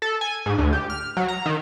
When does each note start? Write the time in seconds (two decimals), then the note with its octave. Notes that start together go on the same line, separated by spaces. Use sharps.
0.02 A4
0.21 G#5
0.46 G#2
0.58 D2
0.73 G4
0.90 F6
1.17 F#3
1.28 A#5
1.46 D#3